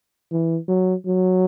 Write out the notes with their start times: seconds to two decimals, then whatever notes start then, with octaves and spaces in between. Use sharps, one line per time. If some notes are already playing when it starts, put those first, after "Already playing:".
0.32 E3
0.68 F#3
1.06 F#3